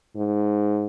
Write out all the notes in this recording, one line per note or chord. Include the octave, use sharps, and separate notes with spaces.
G#2